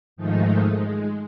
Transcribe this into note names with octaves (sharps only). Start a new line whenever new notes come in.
G#2 D#3 F3 G#3 A3 D#4
G#3